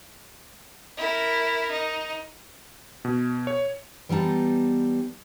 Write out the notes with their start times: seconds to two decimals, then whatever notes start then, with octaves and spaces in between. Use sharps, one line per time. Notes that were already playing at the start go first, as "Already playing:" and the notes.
0.97 E4 A#4
1.71 D#4
3.05 B2
3.47 C#5
4.09 E3 G3 B3 D#4 A5